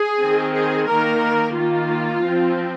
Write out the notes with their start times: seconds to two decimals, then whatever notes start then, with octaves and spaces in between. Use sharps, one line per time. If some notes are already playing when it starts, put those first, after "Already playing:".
Already playing: G#4
0.20 D#3 C4
0.54 G#4
0.88 D#3 A#3 A#4
1.56 D#3 A#3 F4
2.24 F3 C4